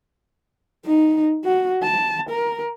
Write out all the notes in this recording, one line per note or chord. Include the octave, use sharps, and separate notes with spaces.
D#4
F#4
A5
A#4